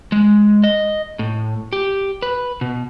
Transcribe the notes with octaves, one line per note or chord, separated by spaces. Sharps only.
G#3
D#5
A2
G4
B4
B2